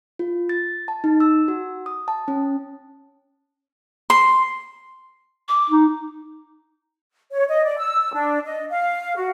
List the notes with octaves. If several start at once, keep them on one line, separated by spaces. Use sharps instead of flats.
F4
A6
A5
D#4
E6
F#4
D#6
A5
C#4
C6
D6
D#4
C#5
D#5
D5
E6
D4
D#5
F5
F#4